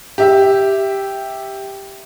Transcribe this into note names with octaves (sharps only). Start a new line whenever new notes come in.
G4 E5